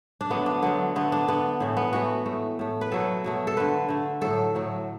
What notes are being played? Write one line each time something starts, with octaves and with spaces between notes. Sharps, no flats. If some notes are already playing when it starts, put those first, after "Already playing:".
D4
D3 F#3 A3 B3
D4
D3 F#3 A3 B3
D3 A3 B3
D4
D3 A3 B3
A2 E3 A3
B3
A2 E3 A3 F#4
A2 A3
A2 A3
B4
B2 F#3 A3 A4
B2 F#3 A3
A4
D3 A3 B4
D3 A3
A2 F#3 A3 A4
A2 F#3 A3